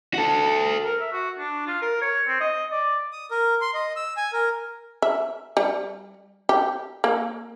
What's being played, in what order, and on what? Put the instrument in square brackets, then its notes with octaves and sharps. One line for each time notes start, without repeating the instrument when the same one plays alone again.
[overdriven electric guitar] F#4 A4
[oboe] A#4
E5
F#4
D4
F4
A#4
C#5
C4
D#5
D5
[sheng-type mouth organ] D#6
A#4
C6
D#5
E6
G#5
A#4
[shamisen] E5
G3
G4
A#3